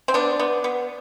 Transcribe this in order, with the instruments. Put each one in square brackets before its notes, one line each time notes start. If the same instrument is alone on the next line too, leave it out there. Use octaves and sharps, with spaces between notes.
[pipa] C4
B3 D4
B3
B3